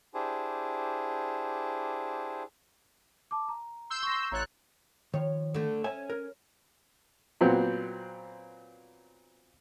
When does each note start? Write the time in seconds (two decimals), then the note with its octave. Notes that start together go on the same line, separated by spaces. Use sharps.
0.14 D4 E4 G4 G#4 C5
3.31 A5 D6
3.49 A#5
3.90 C6 E6 G6
4.03 C#6 A#6
4.32 A1 C#5 A#5 F#6 A6
5.14 D#3 F3 C#5
5.54 D3 A3
5.84 C#4 E5 G#5
6.10 A#4
7.41 A#2 F#3 B3 C4